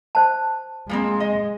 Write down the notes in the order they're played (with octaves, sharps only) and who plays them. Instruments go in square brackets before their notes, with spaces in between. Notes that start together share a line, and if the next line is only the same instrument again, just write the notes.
[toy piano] C5 A5
[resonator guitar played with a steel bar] F3 A#3 C4 [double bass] G#3
[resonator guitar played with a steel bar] D#5